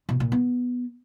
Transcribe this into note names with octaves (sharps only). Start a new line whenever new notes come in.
B2
A#2
B3